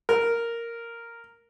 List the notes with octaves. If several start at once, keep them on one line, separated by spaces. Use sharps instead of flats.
A#4